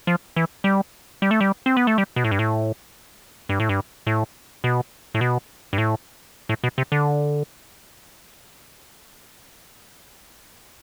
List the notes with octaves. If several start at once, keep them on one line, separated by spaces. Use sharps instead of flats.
F3
E3
G3
G3
A3
G3
C4
B3
A3
G3
B2
A2
G2
A2
G2
A2
G2
A2
B2
A2
B2
G2
A2
A2
B2
C3
D3